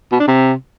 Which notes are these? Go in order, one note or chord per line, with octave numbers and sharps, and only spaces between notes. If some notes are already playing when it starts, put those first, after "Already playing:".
B2
D4
C3